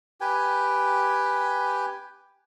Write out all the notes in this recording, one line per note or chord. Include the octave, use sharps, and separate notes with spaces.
G4 B4 G5 G#5